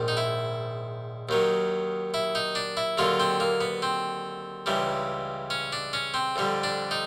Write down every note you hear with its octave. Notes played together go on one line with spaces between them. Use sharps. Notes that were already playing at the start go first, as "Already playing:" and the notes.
Already playing: A#1 G#2 D#3
D#4
E4
D#2 D#3 F#3
E4
D#4
D4
E4
D#2 D3 F#3 F4
C4
A#3
B3
C4
C#2 C#3 E3 G3
C#4
D4
C#4
C4
F2 D3 G3
D4
D#4